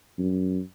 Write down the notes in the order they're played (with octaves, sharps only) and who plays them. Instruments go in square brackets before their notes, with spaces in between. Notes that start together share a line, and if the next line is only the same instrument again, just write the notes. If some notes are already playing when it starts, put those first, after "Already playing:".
[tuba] F#2